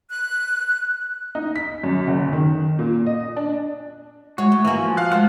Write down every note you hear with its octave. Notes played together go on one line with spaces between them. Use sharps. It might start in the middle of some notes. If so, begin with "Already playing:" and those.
F#6
D#4
B6
F#2
F#1
D#3
A#2
D#5
D4
G#3 F#4 C#5
A3
E3 A#3 F#4 G#5
F3
F5 F6 F#6
G#3 A3 F4 C5 C#5 F#5